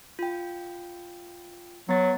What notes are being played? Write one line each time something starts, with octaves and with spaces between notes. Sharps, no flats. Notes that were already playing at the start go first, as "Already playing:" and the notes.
F4 G5
F#3 B3 A6